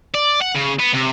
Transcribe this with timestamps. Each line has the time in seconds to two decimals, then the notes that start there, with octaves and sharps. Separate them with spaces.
0.14 D5
0.41 F#5
0.56 C#3
0.80 B3
0.94 C3